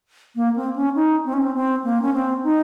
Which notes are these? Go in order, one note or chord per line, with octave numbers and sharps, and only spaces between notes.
A#3
C4
C#4
D#4
C4
C#4
C4
C4
A#3
C#4
C4
D#4